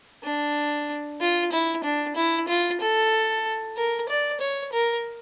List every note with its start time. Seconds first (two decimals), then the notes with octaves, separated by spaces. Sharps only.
0.24 D4
1.20 F4
1.52 E4
1.84 D4
2.16 E4
2.48 F4
2.80 A4
3.77 A#4
4.09 D5
4.41 C#5
4.72 A#4